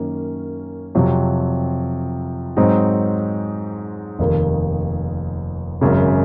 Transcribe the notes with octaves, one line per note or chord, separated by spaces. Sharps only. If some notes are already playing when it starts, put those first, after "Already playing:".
Already playing: F#2 D#3 A#3 C#4
F2 C3 F#3
G#2 F#3 C4 D#4
F1 D#2 D#3
G#1 F#2 C#3